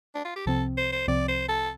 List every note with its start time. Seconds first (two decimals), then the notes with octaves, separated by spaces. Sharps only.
0.15 D4
0.25 F4
0.36 G4
0.46 C2 C3 F3 C4 A4
0.77 C5
0.92 C5
1.08 C2 C3 F3 C4 D5
1.28 C5
1.49 A4